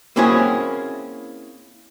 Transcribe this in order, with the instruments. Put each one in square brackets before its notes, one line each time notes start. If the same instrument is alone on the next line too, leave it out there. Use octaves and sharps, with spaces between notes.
[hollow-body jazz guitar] A#3 C4 C#4 E4 F#4 G#4